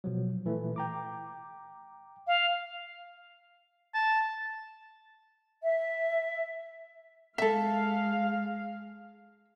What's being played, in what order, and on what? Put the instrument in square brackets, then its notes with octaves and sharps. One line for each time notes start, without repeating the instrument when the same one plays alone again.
[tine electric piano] B2 F3 F#3
A#2 E3 A3
G5 A#5 D6
[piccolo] F5
[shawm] A5
[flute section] E5
[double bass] G#3 [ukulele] A4 E5 [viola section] F5